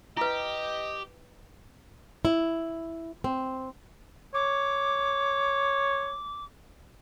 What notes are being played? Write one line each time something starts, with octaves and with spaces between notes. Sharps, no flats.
E4 G4 B4 D#5
E4
C4
C#5 D6